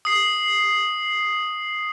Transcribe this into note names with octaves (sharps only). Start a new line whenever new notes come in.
D#6 C7